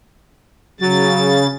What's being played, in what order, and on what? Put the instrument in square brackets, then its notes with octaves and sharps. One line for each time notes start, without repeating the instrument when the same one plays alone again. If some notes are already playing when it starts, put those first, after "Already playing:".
[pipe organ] C#3 A6 [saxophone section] F#3